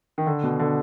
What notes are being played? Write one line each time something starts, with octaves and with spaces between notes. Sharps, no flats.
D#3
D3
B2
D3